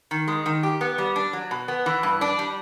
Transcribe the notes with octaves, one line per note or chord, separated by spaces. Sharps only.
D#3
G#3
D#3
G4
B3
G3
D4
F#3
B2
B3
E3
G2
D4
G3